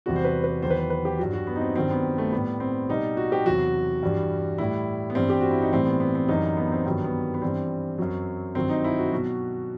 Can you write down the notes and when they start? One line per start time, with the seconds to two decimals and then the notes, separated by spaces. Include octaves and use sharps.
0.06 E2 C3 E3 G3 F#4
0.16 C5
0.25 B4
0.44 B4
0.62 E2 D#3 F#3 C5
0.70 B4
0.77 C5
0.90 B4
1.05 G4
1.19 G2 F#3 F#4
1.33 F#4
1.47 B3
1.56 D#4
1.61 C4
1.75 G2 D#3 F#3 C4
1.91 B3
2.18 A3
2.32 A2 G3 B3
2.60 C4
2.89 B2 G3 D#4
3.17 F#4
3.32 G4
3.45 E2 C3 F#3 F#4
4.03 G2 E3 G3
4.58 A2 G3 E4
5.10 B3
5.15 G2 E3 G3 C4
5.30 G4
5.41 F#4
5.51 E4
5.62 D#4
5.72 A2 E3 G3 C4
5.86 B3
6.00 B3
6.15 C4
6.28 F#2 E3 G3 D#4
6.57 B3
6.72 C4
6.86 G2 D#3 F#3 B3
7.04 B3
7.34 B3
7.42 G2 E3 G3 C4
7.98 F#2 F#3
8.55 G2 D#3 F#3 C4
8.69 D#4
8.84 E4
8.99 F#4
9.12 B2 F#3